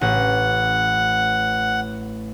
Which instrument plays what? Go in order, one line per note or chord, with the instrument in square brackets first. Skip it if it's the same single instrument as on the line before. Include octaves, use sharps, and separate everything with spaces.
[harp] A1 [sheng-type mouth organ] F#5